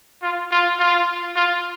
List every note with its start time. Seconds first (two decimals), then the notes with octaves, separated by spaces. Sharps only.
0.22 F4
0.51 F4
0.79 F4
1.36 F4